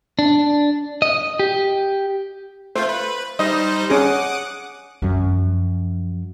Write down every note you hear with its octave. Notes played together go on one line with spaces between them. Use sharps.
D4
D#5
G4
A3 F4 C5
B4
G3 D#4 C5 D#5
C#4 G#4 F#5 D6 D#6
F#2 F3